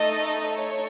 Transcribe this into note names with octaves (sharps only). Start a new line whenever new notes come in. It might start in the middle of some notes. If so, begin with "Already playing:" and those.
Already playing: A3 D#4 A4 D#5
C#5